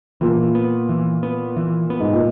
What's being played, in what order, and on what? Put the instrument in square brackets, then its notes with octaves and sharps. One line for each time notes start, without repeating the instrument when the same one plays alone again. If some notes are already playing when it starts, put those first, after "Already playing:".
[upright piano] A#2 [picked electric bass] E3
[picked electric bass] B3
E3
B3
E3
B3
[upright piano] G#2
A#2